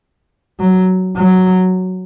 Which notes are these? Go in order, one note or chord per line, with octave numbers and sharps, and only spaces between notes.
F#3
F#3